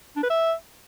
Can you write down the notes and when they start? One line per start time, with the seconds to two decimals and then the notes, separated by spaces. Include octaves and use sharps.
0.16 D4
0.23 B4
0.30 E5